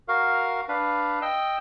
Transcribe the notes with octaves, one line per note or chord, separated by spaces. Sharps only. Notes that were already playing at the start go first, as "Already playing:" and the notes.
F#4 A#4 F5
D4 B4 F5
D#5 G5 E6